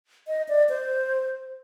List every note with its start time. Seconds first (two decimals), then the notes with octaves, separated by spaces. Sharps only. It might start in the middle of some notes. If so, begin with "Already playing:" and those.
0.28 D#5
0.49 D5
0.70 C5